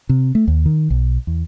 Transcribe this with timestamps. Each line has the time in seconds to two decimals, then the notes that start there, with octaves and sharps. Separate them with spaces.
0.09 C3
0.35 A3
0.47 D#2
0.66 D#3
0.90 B1
1.27 E2